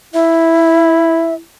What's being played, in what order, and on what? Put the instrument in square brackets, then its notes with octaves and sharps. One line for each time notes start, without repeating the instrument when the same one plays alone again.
[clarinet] E4 [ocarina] E5